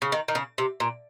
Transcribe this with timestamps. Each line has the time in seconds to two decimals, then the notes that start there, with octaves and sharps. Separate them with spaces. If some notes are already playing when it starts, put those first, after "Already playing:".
0.02 C#3
0.12 D#3
0.28 D#3
0.35 C#3
0.58 C3
0.80 A#2